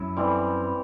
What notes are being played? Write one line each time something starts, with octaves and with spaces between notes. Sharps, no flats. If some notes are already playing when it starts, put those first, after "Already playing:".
Already playing: F#2 E4
E3 G3 C4